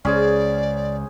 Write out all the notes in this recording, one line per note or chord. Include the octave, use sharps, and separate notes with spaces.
C#2 C#4 G#4 C5 D5